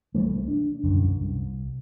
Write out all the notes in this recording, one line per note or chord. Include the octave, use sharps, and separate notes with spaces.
C2 E3 G3 A3
D4
E1 C2 F#2 D3
C2